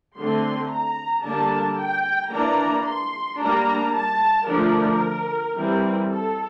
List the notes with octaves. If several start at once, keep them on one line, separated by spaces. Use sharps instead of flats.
D3 A3 C4 C6
A#5
D3 G3 A#3 D4 A5
G5
E3 A#3 D4 A#5
C6
G3 A#3 D4 A#5
A5
D3 F3 A3 D4 A#4
E3 G3 C4
A4